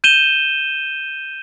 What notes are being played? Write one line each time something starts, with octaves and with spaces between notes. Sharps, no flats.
G6 D#7 E7 G7